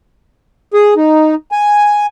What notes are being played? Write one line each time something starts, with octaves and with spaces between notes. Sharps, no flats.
G#4
D#4
G#5